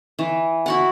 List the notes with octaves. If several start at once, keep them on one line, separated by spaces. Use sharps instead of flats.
E3
E4 F#4 F#5